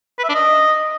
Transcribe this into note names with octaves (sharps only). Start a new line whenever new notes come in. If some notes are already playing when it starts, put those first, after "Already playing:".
B4
E5
D4
D#5